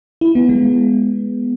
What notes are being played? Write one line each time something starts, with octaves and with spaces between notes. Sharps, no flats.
E4
B3
G#3